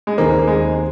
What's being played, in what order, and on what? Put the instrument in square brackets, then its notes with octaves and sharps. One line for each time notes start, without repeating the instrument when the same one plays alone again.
[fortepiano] G#3
[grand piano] D#2 D#3 C4 D#4 G#4 [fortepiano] A#3
[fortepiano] A#3
G#3